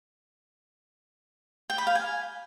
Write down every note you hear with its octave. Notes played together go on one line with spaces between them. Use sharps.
G5
B5
F5
G#5